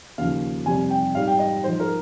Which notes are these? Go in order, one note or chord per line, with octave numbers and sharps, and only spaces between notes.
D#2 C#3 F3 F5
F2 C3 G3 G#5
G5
G#2 G3 F5
G5
D#5
G#2 F3 C5
A#4